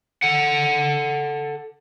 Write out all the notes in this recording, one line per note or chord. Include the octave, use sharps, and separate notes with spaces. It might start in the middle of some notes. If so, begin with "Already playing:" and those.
A4 F#5